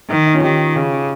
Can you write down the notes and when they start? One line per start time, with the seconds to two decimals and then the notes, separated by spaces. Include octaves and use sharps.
0.10 D#3 D#4
0.26 D#4
0.34 C#4 F4
0.43 D#3 D#4 G4
0.75 C#3